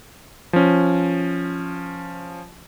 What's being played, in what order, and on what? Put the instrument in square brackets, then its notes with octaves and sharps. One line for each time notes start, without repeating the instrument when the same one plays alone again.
[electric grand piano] F3 C#4